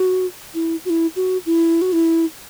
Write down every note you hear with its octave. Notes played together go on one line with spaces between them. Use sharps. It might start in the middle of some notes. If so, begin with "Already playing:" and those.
Already playing: F#4
E4
F#4
E4
F#4
E4
F#4
E4